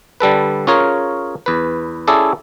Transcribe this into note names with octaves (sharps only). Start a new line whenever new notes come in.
D3 G3 A4 B4
C#4 F4 G#4 A#4 C#5
E2 B4
C#4 E4 G#4 A4 D5